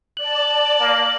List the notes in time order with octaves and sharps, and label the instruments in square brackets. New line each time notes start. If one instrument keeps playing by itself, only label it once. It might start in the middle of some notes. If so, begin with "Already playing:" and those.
[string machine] D5 A5 [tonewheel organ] F#6
[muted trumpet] A#3